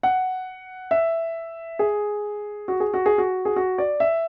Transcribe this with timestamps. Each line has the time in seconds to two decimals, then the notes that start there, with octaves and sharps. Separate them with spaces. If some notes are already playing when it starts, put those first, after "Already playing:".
0.03 F#5
0.91 E5
1.79 G#4
2.68 F#4
2.80 G#4
2.94 F#4
3.06 G#4
3.18 F#4
3.45 G#4
3.56 F#4
3.78 D5
4.00 E5